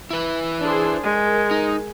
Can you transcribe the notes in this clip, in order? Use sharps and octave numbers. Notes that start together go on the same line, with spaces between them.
E4 B4
D4 G#4 C5
G#3 A#4
D#4